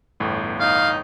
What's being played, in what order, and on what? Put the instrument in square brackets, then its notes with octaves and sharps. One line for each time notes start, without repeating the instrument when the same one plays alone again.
[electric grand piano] G1 E2 A2
[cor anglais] D#4 [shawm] F5